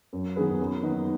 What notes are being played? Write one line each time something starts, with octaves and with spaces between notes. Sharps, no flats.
F#2
D#3 B3 G#4 B4
F#2
D#3 B3 D#4 B4